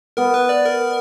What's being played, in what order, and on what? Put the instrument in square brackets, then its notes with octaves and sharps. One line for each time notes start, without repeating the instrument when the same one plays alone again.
[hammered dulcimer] B3 [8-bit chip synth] A#4
[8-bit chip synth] B4
D5
A#4